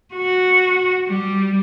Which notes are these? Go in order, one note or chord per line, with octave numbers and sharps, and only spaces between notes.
F#4
G3